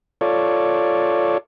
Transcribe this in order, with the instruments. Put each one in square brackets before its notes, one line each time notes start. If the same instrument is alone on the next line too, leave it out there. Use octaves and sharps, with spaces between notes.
[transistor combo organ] F4 A4 C#5 D5